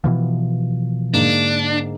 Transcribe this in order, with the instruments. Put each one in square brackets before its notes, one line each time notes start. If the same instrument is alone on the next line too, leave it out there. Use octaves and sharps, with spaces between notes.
[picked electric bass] B2 E3 F3
[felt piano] G#2 D3 A#3 [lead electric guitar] D4